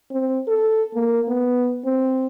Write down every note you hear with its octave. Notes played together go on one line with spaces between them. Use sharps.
C4
A4
A#3
B3
C4